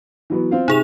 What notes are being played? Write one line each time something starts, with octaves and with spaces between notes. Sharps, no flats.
E3 F#3 B3
C4 F4 F5
C3 D#4 G#4 F7